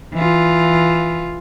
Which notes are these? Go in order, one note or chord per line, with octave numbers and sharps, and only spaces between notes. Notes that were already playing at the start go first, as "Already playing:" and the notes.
E3 F4